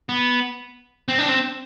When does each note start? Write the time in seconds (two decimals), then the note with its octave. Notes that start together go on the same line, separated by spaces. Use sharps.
0.09 B3
1.08 C4
1.19 D4
1.29 C4